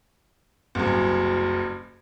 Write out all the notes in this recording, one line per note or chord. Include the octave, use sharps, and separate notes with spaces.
F#1 C2 F#2